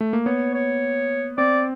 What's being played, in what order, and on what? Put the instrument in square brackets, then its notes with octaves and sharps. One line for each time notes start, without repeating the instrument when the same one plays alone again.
[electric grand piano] A3
A#3
[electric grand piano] B3 [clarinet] C#5
[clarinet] C#5
[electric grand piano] C4 [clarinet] D5